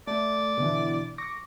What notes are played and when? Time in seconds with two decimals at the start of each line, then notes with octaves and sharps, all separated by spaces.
0.07 A3 D5
0.58 B2 D3 E3
1.18 C#6 D6 A#6